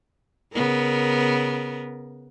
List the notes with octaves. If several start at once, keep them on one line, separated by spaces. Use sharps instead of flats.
C#3 B3 A#4